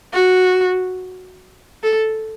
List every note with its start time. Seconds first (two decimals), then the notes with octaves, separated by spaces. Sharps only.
0.13 F#4
1.83 A4